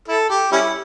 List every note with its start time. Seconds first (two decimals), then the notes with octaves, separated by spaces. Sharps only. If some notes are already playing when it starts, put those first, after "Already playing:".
0.08 E4 A4
0.30 G4
0.52 G3 C#4 E4